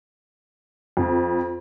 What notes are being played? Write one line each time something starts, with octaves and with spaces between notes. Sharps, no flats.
F2